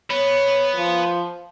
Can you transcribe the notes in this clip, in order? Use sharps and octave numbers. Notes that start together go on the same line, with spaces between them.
B3 C#5
F3